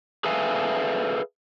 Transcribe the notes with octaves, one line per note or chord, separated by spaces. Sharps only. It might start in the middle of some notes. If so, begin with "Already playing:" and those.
G#4 A4 B4 E5 F5 G#5